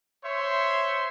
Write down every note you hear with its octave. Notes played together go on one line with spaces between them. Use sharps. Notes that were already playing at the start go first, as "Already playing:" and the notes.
C5 C#5 E5 C6